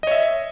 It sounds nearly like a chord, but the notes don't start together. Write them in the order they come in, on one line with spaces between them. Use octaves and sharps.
D#5 C#5 E5